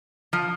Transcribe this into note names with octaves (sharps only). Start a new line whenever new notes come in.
F3